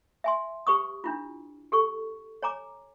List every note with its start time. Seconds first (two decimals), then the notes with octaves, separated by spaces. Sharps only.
0.24 E5 G#5 C6
0.67 G4 B4 C#6 D#6
1.04 D4 E4 F4
1.72 G4 A4 C#6
2.43 C#5 G#5 A#5 D6